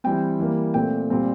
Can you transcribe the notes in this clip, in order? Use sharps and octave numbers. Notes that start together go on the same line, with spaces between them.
E3 G3 C4 G5
E3 G3 A#3
A#2 A3 C4 G5
A#2 G3 C4